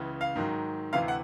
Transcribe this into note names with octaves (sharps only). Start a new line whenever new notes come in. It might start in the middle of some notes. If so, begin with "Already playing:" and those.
Already playing: C#2 C#3 E3
F5
G#2 D#3 F#3
D2 C3 E3 F5
F#5